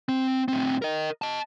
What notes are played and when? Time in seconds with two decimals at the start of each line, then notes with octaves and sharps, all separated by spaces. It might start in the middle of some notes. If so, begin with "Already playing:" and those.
0.09 C4
0.48 A2 C4
0.82 A#4 D#5
1.22 D#5 A5